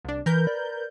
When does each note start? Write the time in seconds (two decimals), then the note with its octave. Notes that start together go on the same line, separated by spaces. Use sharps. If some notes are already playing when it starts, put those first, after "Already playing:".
0.05 C2 D4
0.26 E3 A#4 B4 G6
0.47 D5